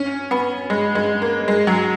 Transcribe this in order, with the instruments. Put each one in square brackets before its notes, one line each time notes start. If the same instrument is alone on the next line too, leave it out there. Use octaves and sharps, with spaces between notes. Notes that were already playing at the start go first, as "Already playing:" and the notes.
Already playing: [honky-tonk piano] C#4
B3
G#3
G#3
A#3
G#3
F#3